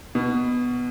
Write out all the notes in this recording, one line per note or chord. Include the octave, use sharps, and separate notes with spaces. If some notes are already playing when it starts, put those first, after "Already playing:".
B2